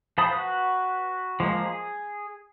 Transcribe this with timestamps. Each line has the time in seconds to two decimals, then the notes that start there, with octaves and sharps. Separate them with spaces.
0.18 F3 C5 A5 B5 D#6
0.33 F#4 B4
1.40 F3 G#3 A#3
1.65 G#4